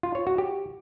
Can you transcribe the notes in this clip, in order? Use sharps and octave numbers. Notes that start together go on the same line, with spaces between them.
F4
C#5
F#4
G4